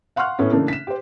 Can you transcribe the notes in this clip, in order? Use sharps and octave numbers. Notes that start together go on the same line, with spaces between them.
F5 F#5 C6 C#6 F6 F#6
A2 B3 C#4
C#3 E3 A3 A#3 D4
B6 E7
G4 C5